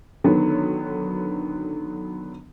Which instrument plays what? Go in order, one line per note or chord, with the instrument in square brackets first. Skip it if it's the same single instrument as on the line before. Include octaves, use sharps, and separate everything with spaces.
[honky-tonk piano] D3 D#3 F#3 B3